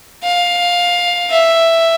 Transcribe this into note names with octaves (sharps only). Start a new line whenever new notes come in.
F5
E5